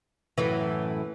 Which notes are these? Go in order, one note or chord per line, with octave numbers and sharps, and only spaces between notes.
F#2 A2 E3